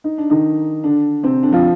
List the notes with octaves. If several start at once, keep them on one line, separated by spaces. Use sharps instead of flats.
D#4
D4
D#3 D#4
D3 D4
C3 C4
D3 D4
F3 F4